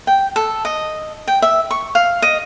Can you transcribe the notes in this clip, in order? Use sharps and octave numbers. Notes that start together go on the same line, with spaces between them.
G5
A4
D#5
G5
E5
C#6
F5
D#5